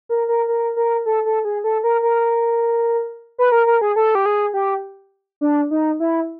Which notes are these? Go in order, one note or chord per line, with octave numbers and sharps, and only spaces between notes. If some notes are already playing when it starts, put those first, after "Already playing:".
A#4
A#4
A#4
A#4
A4
A4
G#4
A4
A#4
A#4
B4
A#4
A#4
G#4
A4
G4
G#4
G4
D4
D#4
E4